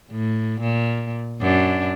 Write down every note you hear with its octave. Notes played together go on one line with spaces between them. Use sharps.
A2
A#2
F#2 D4